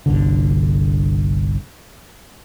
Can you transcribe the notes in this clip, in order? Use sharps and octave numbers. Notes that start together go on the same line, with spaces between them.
G1 C2 D3